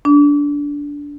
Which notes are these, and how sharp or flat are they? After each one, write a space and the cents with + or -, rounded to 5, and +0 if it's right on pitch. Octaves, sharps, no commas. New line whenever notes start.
D4 -20